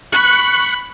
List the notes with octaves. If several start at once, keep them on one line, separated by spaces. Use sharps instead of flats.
B5 C#6 F#6